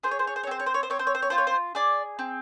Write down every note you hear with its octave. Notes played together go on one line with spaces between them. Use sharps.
G#4 C5
C#5
C5
C#5
C5
C#5
C4 C5
C#5
C5
C#5
C5
C4 C#5
C5
C#5
C5
C#5
F4 C5
C#5
C5
G#4 D5
C4